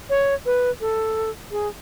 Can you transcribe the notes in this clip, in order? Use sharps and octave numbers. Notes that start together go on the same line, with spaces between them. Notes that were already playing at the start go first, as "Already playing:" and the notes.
C#5
B4
A4
G#4